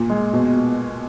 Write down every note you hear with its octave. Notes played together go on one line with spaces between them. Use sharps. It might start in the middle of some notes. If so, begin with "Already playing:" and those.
Already playing: A#2
G#3
B2